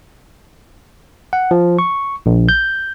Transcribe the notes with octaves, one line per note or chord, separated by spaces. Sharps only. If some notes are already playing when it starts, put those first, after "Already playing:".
F#5
F3
C#6
A#1
G6